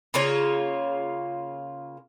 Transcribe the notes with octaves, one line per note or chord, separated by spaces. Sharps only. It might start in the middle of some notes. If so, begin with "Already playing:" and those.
C#3 A#3 F4 C#5